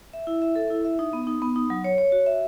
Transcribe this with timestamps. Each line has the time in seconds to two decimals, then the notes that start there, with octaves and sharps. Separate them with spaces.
0.13 E5
0.27 E4
0.42 E5
0.55 A4
0.70 E4
0.85 E5
0.99 D#4
1.13 B3
1.27 D#4
1.42 B3
1.56 D#4
1.70 F#3
1.84 C#5
1.98 C#5
2.12 F#4
2.26 E5